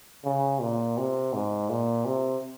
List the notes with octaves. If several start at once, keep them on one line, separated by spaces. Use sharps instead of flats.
C#3
A#2
C3
G#2
A#2
C3